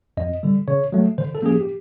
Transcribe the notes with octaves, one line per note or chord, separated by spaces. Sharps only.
F2 D#5
D3 G3
C#3 C#5
F#3 A3
D3 C5
A4
F3 A#3 C#4 G#4
G4
G4